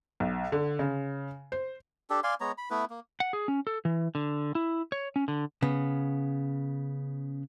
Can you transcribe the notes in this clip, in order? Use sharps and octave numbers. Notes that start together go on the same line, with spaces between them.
B1
D3
C#3
C5
D4 G4 A4
D5 F5 G#5 C6
G#3 B3 C#5 A#5
B5
A3 B3 E4 B4
A#3
F#5
G#4
C#4
A4
E3
D3
E4
C#5
C#4
D3
C#3 B3